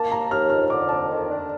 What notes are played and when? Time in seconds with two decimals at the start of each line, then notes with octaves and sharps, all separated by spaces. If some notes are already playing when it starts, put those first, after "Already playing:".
Already playing: A#3 A5
0.11 D#2 A#5
0.31 D#2 F6
0.50 F2 F6
0.70 D3 D6
0.89 F2 A5
1.09 D#3
1.29 D4